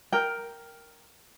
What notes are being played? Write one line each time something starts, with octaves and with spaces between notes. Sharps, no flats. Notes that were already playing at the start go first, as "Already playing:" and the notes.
A#4 G5